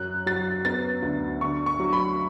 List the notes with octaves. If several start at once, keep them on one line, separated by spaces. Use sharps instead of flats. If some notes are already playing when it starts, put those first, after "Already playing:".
Already playing: F#2 F#6
F#3 A6
B3 A6
D2
D3 C#6
C#6
F#3
B5